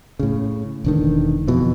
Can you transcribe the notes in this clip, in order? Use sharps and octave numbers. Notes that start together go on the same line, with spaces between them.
A2 C#3
E1 D3 D#3
F2 B2 E3